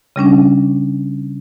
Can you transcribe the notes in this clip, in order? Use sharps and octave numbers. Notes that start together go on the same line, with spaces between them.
C#3 G3 C#4 D4